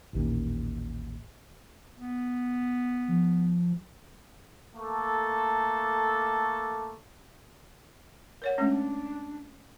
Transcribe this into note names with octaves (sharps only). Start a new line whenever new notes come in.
A1 D#2 A#2
B3
F3
A3 A#3 A4
A#4 C#5 F#5
G#3 A3 C#4 D4